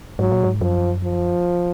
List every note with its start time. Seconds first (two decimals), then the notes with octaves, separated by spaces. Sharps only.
0.19 G#2 F#3
0.32 A#2
0.43 G#2
0.61 F#2 F3
1.04 F3